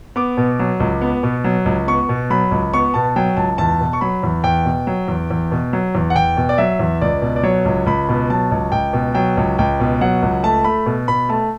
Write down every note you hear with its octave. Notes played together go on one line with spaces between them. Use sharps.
B3 D6
B2
F#3
C#2
B3
B2
F#3
C#2
B3 C#6
B2
F#3 B5
C#2
B3 C#6
B2 A5
F#3 G5
C#2 A5
E2 A5
B2
C#6
F#3 B5
E2
E2 G5
B2
F#3
E2
E2
B2
F#3
E2
F#5
E2 G5
B2
D5
F#3 E5
E2
C#2 D5
B2
D5
F#3 C#5
C#2
C#2 B5
B2
F#3 A5
C#2
C#2 G5
B2
F#3 G5
C#2
C#2 G5
B2
F#3 F#5
C#2
A3 A5
A3 B5
B2
B2 B5
A3 A5